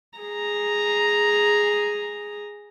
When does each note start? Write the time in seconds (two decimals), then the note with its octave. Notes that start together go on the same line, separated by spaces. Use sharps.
0.19 G#4 A#5